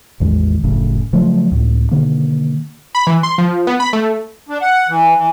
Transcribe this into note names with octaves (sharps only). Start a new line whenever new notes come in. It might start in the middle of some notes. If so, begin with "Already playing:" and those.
A1 E2 D#3 G#3
F#1 F2 A2 C#3
C#3 F3 F#3 A3
C#2 A2
B2 D3 D#3 A#3
B5
E3
C6
F3
B3
B5
A3
D4
F#5
E3
E3